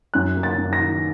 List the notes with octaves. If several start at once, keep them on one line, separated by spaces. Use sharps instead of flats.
F#2 F#6
A#3
A6
F#2
A#6
D#3